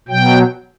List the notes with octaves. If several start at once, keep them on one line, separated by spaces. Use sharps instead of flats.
B2 F#3 G5